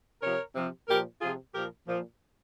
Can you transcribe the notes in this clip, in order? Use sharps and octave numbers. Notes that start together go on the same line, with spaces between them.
C3 F3 A#4 C#5
C3 F3
A#2 F3 G4 A#4
C3 F3 F4 G#4
A#2 F3 G4 A#4
A#2 F3